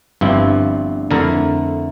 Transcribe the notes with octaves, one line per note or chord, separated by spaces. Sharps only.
G1 G2 F3 C4 E4
F2 D3 A3 E4 A#4